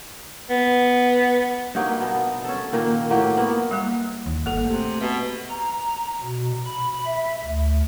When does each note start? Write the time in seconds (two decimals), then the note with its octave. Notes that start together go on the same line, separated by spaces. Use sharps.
0.50 B3
1.75 G2 F#3 A#3 D#4
1.97 B2 B3
2.44 C#4 A4
2.73 A#2 D#3 A#3
3.10 A2 F#3 A#3 G4
3.37 A#3 B3 F#4
3.71 G3 A#3
4.26 D#2
4.46 G1 A#3 A4
4.65 C3 A3
5.01 B2 E5
5.50 A#5
6.23 B2
6.66 B5
7.06 E5
7.44 D2